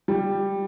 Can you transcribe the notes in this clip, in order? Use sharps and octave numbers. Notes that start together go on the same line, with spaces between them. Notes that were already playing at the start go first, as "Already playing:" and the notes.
G3